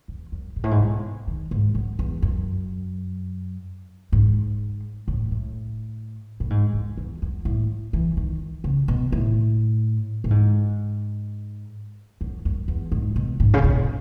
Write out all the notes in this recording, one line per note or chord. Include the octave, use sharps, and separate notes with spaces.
E2
F#2
G#2
A2
G#2
B2
D#3
G#2
F#2
E2
F#2
G#2
A2
A2
A2
G#2
F#2
E2
F#2
A2
E3
D#3
C#3
B2
A2
A2
G#2
F#2
F#2
E2
G#2
B2
G#2
C#3
B2